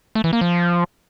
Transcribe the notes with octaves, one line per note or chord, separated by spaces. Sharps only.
A3
E3
A#3
F3